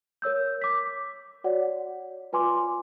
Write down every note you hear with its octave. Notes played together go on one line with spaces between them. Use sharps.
A#4 C#5 E6 G6
D6 B6
F#4 C#5 D5 F#5
F4 B4 G#5 C6 D6